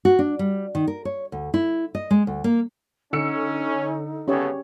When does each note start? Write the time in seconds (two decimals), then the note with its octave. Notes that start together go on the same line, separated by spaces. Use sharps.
0.05 F#4
0.19 D4
0.39 G3
0.75 D#3
0.87 A#4
1.05 C#5
1.32 D2
1.54 E4
1.95 D#5
2.11 G#3
2.27 D2
2.44 A#3
3.13 D3 C#4 D#4 E6 C#7
4.28 C#3 B3 C#4 G4 A4 C#5